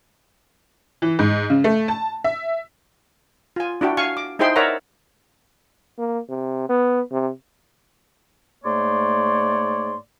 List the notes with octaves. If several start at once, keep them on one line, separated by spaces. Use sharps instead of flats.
E3
G#2
C#3
A3
A5
E5
F4 G#5
D4 E4 F#4 G5
F5 G#5 C#6
D6
D#4 E4 G#4 C5 G5 C6
A#4 C#5 D5 E5 F#5 A#5
A#3
C3
B3
C3
G#2 A3 A#3 C#5 D5 C6